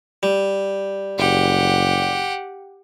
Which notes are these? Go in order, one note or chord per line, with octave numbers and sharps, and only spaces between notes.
G3
F#1 G4 F#5